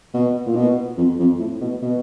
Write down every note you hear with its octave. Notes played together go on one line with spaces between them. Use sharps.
B2
A#2
B2
F2
F2
A2
B2
B2